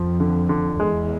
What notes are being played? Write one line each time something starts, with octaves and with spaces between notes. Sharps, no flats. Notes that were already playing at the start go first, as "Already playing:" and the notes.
Already playing: F2 F3
D3
D3
E2 G#3